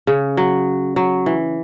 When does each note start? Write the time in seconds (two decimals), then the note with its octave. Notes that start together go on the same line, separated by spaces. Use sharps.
0.07 C#3
0.37 F#3
0.96 F#3
1.26 E3